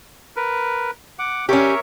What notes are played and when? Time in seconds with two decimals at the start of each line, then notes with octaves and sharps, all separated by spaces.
0.36 A#4 B4
1.19 F#5 D6
1.49 C#4 G4 A#4 C#5 E5